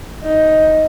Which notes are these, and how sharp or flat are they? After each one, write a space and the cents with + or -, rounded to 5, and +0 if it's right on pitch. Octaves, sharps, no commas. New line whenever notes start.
D#4 +10